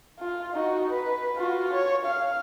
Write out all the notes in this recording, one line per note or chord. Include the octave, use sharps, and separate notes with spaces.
F4
D#4 F#4
B4
F4 F#4
C#5
F5